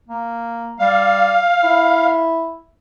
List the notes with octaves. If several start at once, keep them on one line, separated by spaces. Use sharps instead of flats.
A#3
G3 F5
E4